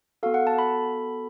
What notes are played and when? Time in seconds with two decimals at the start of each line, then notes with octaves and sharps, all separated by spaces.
0.23 B3 F#4 A4 F5
0.34 F#5
0.47 A5
0.58 B5